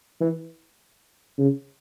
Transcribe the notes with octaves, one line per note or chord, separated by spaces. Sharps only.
E3
C#3